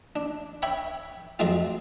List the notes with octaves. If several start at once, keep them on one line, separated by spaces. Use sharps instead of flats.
D4
C#5 E5 G5 B5 C#6
F2 F#3 G#3 A3 C4 F4